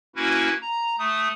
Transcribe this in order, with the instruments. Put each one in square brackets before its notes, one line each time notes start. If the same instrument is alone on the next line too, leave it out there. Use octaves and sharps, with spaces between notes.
[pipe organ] A#3 C#4 E4 F#4 B4
A#5
A3 D#6